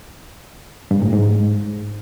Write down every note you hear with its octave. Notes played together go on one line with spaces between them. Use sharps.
G2
A2
G#2